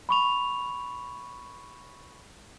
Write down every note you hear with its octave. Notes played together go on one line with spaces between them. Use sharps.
B5 C#6 F7